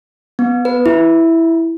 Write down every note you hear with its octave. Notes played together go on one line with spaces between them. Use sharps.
B3
B4
E4